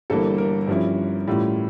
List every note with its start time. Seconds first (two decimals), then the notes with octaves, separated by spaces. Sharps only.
0.10 G1 G2 E3 A#3 A4
0.38 A#4
0.68 G2 F3 C#4 E4
1.28 A2 E3 G3 C#4 F4